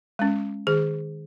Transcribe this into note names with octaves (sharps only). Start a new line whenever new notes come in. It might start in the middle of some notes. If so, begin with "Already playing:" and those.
G#3 C#4
D#3 G#4